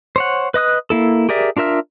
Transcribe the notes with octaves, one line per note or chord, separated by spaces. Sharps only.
C5 C#5 F#5
B4 D#5 D#6 F#6
A#3 E4 A4
G4 G#4 A#4 D5 E5
D4 F4 A#4 E5 F6